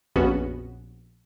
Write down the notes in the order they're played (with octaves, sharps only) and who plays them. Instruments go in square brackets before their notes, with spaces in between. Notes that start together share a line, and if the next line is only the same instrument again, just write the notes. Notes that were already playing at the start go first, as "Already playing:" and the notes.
[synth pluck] A#1 F2 B3 C#4 F#4